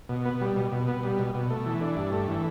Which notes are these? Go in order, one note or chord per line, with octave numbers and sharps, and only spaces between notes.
B2
B3
G3
B2
B2
B3
G3
B2
B2
A3
E3
D4
G2
A3
E3